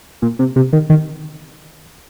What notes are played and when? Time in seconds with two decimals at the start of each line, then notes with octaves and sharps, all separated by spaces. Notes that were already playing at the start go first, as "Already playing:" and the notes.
0.22 A#2
0.39 C3
0.56 C3
0.73 D#3
0.90 D#3